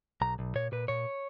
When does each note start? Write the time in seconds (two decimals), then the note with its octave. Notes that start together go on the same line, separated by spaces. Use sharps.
0.21 B1 A#5
0.39 B1
0.55 A#2 C#5
0.72 A#2 B4
0.88 A#2 C#5